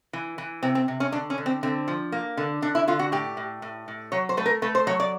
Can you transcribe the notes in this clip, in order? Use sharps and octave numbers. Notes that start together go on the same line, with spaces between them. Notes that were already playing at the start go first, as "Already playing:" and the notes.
E3
E3
C3 C4
C4
C3
C#4
D3 D4
C#4
D3
C4
D3 C4
F3
A#3
D3
D3 D4
E4
D3 F4
F#4
A2 G4
A2
A2
A2
F#3 C#5
C5
A3 B4
A#4
A3 B4
C5
F#3 C#5
D5